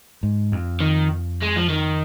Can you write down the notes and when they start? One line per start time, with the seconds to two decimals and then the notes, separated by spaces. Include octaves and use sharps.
0.23 G#2
0.52 F2
0.81 D#3
1.42 G#3
1.56 F3
1.69 D#3